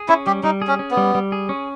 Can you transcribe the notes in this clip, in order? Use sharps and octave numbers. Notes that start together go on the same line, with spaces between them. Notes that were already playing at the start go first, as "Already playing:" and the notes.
Already playing: G#4
C#4 E4
G3 G4
G3 D#4
G#4
C#4
C#4
B3
G3
G3
G#4
C#4